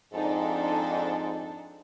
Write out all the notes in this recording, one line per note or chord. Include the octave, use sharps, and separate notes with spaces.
F2 G#2 D4 D#4 A4